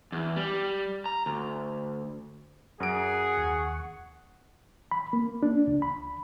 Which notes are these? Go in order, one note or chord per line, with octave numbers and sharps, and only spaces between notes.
E2
G3
A#5
D2
F#2 G#4 F#5 A#5 D#6 D7
D#2 C#6
B5
A#3
D4
C#2
B5